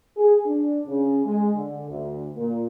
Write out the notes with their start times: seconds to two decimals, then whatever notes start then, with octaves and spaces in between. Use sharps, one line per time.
0.17 G#4
0.45 D4
0.87 C#3
1.25 G#3
1.55 D3
1.90 D2
2.35 A#2